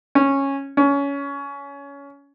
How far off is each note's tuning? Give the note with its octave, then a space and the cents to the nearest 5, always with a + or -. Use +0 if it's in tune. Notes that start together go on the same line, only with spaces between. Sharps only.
C#4 -10
C#4 +20